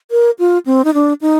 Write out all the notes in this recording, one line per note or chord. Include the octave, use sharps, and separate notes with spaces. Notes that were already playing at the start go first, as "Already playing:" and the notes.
A#4
F4
C4
D#4
D4
D#4